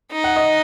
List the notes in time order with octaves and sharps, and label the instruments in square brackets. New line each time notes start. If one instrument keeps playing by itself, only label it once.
[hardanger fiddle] D#4
[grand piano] F#5
D#5